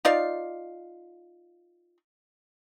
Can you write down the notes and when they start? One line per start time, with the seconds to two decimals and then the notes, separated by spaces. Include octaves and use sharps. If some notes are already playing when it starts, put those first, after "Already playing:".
0.05 D#4 F4 D5 F5